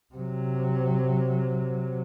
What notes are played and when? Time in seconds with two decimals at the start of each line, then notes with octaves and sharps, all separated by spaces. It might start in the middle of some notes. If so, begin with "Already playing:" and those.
0.15 C3 F#3